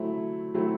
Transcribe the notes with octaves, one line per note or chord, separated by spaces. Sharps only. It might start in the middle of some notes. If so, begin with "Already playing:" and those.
Already playing: F#3 A3 C4 E4
F#3 A3 C4 E4